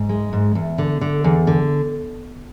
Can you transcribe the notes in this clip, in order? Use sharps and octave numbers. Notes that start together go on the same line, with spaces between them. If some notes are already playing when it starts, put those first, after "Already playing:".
Already playing: G#2
G#3
G#2
E2
D3
D3
E2
D3